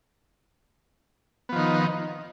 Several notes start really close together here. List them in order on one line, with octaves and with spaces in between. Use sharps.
B3 F3 D#3 D#4